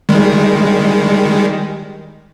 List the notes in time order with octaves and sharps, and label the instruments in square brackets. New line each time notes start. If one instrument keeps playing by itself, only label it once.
[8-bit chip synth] D#3 G3 G#3